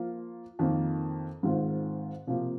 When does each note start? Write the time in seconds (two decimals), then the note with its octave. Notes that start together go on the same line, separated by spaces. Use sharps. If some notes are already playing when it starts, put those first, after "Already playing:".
Already playing: F3 A#3 F4
0.59 F2 D#3 A#3
1.43 G#2 D#3 G#3 C4 F4
2.27 C3 F3 A#3